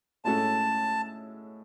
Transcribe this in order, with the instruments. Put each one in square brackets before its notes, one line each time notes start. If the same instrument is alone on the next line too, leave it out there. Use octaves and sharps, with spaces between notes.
[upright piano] A2 G#3 C#4 F#4 A4 [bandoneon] A5